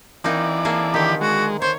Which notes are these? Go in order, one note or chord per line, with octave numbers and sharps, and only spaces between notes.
E3 A#3 C4 D#4 D5
A#3 G#4 A4
D3 D#3 G4
G#3 F#4
C5 C#5